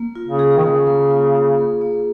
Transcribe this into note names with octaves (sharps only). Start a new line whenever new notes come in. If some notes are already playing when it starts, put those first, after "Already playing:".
Already playing: A#3
F4
C#3
G#4
D#3
C#3 A#3
A#3
F4
G#4
A#3
A#3